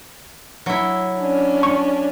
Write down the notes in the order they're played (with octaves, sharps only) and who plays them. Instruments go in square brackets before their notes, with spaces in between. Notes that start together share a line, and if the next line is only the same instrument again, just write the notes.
[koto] F#3 E4
[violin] C#4 D4
[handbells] C#6